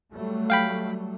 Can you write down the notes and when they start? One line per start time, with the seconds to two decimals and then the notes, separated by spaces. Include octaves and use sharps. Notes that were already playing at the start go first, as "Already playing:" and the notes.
0.12 F#3 G3 A3
0.50 F5 G5 B5